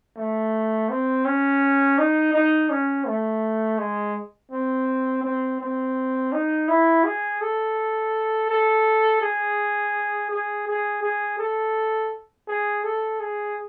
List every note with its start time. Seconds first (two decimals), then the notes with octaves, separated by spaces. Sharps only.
0.16 A3
0.89 C4
1.25 C#4
1.98 D#4
2.34 D#4
2.70 C#4
3.06 A3
3.78 G#3
4.52 C4
5.23 C4
5.60 C4
6.32 D#4
6.68 E4
7.04 G#4
7.41 A4
8.50 A4
9.22 G#4
10.30 G#4
10.67 G#4
11.03 G#4
11.39 A4
12.48 G#4
12.84 A4
13.20 G#4